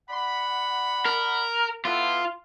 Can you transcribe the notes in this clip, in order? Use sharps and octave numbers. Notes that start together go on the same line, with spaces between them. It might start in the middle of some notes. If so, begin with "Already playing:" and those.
D5 F#5 B5
A#4
B3 E4 F4 A4